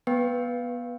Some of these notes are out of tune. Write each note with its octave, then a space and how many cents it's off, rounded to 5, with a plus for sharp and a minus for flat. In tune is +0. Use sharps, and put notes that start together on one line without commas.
B3 -20 B4 +0 G5 +0